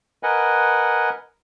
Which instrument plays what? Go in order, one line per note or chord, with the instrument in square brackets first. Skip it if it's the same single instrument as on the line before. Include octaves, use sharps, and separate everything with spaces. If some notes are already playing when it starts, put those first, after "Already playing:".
[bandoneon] A#4 B4 D#5 F#5 G#5